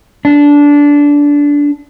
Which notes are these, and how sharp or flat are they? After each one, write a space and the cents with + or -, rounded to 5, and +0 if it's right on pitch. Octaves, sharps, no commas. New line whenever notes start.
D4 -15